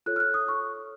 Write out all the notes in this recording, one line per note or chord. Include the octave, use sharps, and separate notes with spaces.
F4 A4 C#5 F#6
F6
F#6
D#6
C#6